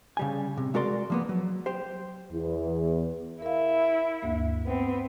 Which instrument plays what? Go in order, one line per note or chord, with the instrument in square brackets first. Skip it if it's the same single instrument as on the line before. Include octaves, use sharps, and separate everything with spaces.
[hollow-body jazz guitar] C#3 G3 G#5
C3
G#3 F#4 A#4 D5 C6
F3 A#3 B3
F#3
G4 C5
[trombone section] E2
[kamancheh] E4 [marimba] A#4 F5
[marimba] D2 G2 A#3
[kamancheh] B3 C4